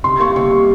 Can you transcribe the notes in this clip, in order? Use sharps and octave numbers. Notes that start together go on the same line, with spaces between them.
C3 C6
A#3 C#6
C3 C#6
G3